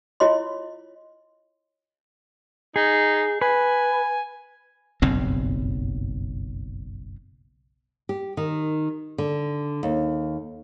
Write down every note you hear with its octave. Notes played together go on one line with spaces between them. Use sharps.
E4 F4 C#5 D#5 C6
D#4 G#4
B4 G#5
F#1 B1 G2 C4
G4
D#3
D3
D#2